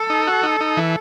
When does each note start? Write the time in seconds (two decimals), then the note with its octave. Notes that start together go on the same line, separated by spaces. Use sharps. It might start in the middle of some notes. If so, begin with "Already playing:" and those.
Already playing: A4
0.10 D#4
0.27 F#4
0.43 D#4
0.61 D#4
0.77 E3